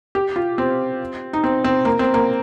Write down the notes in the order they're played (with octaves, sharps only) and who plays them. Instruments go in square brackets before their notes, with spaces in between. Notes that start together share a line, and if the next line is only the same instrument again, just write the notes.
[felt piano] G4
F4
C4
D#4
C4
C4
A#3
C4
A#3